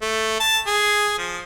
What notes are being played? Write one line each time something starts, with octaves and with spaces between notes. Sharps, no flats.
A3
A5
G#4
F3